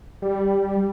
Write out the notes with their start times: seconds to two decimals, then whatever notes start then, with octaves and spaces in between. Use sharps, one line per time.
0.22 G3